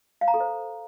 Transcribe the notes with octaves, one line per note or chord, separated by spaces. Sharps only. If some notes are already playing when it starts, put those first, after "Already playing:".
F5
A#5
A4
C5